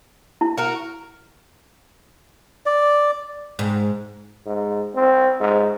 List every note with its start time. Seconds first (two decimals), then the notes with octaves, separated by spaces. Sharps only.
0.41 E4
0.57 F#4 A#4
2.66 D5
3.59 G#2
4.46 G#2
4.95 C4
5.40 G#2